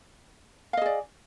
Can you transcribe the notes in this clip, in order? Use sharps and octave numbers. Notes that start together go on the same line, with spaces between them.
G#4 D5 D#5 F5